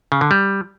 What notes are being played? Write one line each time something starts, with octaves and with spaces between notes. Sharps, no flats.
C#3
D3
G3